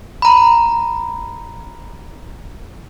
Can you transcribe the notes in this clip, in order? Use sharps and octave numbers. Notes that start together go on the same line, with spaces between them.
A#5 B5